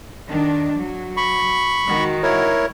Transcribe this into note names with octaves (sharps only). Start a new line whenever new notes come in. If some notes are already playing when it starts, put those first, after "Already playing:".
D#3 D4
F#3
B5 C#6
D#3 G#3 F#4
E4 A#4 C#5